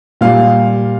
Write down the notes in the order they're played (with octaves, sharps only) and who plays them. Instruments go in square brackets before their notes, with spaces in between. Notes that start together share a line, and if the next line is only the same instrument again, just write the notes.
[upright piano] A#2 G3 F5